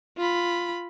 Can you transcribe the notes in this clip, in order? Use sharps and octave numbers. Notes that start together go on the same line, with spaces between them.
F4 B5